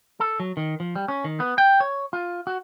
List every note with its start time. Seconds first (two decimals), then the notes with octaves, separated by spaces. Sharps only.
0.20 A4
0.40 F#3
0.57 D#3
0.80 F3
0.96 G3
1.08 C#4
1.24 D#3
1.40 B3
1.58 G5
1.80 C#5
2.13 F4
2.47 F#4